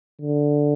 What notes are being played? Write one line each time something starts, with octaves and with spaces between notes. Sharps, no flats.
D3